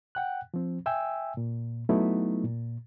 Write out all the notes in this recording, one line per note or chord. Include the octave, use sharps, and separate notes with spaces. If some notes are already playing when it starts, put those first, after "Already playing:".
F#5 G5 F#6
F3 C4
E5 G5 G#5 E6
A#2
F#3 A3 B3 D#4 E4
A#2